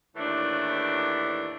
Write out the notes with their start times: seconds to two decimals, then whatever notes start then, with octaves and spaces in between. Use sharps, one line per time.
0.16 D#2 A2 E3 D4